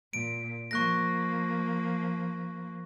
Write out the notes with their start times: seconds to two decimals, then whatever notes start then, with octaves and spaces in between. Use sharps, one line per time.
0.13 A#2 D7
0.71 F3 A#3 C#6 F#6 A#6